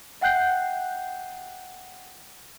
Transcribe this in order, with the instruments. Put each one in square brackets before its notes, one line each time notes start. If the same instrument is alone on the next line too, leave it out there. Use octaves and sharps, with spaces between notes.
[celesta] E5 F#5 G5 F#6 G6 C7